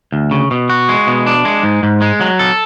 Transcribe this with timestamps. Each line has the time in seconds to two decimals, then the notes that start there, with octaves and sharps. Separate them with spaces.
0.12 D2
0.31 C#3
0.51 B2
0.70 F#4
0.89 G#3
1.07 B2
1.27 D4
1.45 G#3
1.63 G#2
1.83 G#2
2.01 G#3
2.21 F#3
2.39 A4